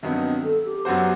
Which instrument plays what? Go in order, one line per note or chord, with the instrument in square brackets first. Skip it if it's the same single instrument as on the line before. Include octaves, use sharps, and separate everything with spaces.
[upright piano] G2 D#3 F#3 B3 D#4 [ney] C4
[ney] A4
G4
[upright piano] F#2 F#3 B3 F#4 C5